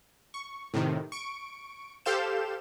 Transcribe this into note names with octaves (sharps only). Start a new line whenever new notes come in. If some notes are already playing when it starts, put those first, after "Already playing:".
C#6
A2 C3 D#3
C#6 D7
G4 A4 C5 F5 G6 E7